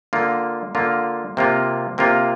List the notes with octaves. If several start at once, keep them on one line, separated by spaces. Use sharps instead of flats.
D3 A#3 F4
D3 A#3 F4
C3 A#3 F4
C3 A#3 F4